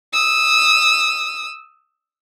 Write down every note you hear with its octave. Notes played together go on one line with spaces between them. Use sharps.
D#6 E6